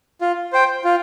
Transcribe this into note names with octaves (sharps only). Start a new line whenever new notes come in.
F4
C5 G5
F4